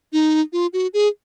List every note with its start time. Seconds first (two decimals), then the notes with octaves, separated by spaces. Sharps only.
0.13 D#4
0.53 F4
0.73 F#4
0.94 G#4